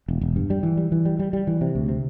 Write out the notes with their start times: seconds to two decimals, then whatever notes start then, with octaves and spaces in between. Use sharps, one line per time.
0.08 E1
0.21 E1
0.36 G2
0.50 G3
0.63 E3
0.77 G3
0.92 E3
1.05 G3
1.19 G3
1.33 G3
1.47 E3
1.61 C3
1.75 D2
1.89 C3